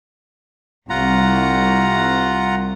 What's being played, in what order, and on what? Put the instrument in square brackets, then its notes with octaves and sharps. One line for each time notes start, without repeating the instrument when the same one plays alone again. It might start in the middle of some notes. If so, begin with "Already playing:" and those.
[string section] C2 [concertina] F4 F#5 A#5